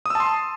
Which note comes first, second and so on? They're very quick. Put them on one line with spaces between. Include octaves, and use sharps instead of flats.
D#6 E6 A5 C6